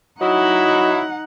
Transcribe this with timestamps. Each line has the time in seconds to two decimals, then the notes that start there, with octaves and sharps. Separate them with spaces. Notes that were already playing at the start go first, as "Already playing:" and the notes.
0.21 F#3 D#4 E4 D#5 F#5